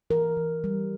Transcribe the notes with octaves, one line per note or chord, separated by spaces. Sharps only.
E3 A#4
E3
G3